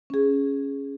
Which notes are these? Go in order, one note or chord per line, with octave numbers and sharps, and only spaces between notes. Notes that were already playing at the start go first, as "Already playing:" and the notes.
C#4 G#4